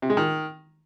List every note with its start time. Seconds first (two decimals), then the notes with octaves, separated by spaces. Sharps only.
0.02 C3
0.10 G#3
0.17 D#3